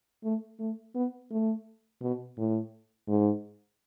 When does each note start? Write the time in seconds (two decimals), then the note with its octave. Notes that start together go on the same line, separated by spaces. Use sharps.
0.24 A3
0.59 A3
0.95 B3
1.31 A3
2.02 B2
2.37 A2
3.08 G#2